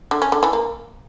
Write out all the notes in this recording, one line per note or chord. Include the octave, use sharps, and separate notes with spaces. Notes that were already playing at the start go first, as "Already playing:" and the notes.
D3
C#4
D3
E3
A#3